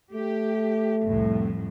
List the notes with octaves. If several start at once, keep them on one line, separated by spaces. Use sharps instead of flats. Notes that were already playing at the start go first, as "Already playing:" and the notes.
A3 G4
C2 F2 A2